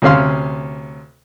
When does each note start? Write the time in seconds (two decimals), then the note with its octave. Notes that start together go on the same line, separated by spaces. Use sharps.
0.02 D2 C3 C#4 F5 C6